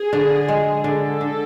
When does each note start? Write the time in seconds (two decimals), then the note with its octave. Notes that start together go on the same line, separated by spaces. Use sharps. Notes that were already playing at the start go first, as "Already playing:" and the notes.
Already playing: G#4
0.13 D3
0.48 G#3
0.84 D3 A4
1.21 D3